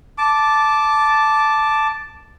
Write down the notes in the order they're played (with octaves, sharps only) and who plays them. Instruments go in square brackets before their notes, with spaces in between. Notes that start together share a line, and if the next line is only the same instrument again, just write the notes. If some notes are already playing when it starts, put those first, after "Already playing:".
[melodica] A5 D6